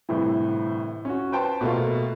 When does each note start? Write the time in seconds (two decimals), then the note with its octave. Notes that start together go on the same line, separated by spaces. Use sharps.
0.09 G1 A2 C3 E3
1.05 C#4 F#4
1.32 B4 C5 G5 A5
1.61 B2 A3 A#3 F4